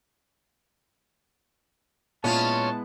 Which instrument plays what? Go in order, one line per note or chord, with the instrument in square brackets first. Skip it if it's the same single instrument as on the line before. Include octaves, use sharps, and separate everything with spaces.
[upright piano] A#2 [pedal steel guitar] G#3 B3 E4 [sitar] C#4 F4 [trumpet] A5